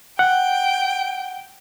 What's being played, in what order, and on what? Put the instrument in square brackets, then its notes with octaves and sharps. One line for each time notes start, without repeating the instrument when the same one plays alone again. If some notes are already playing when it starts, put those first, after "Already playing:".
[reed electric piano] F#5 [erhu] G5